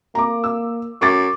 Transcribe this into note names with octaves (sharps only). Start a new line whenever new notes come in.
A#3 A#5 D6
E6
F#2 C#6 D6 A6